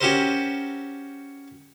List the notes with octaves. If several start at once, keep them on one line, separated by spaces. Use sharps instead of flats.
C#4 F#4 G4 A4 A#4 C5